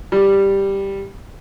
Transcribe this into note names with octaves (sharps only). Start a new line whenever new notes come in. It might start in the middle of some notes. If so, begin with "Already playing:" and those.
G3